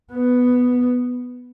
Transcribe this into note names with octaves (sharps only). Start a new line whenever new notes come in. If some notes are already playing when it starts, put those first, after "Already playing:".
B3